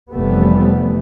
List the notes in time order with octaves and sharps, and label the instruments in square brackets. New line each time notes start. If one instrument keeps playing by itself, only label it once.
[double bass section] F1 E3 G3 A3 B3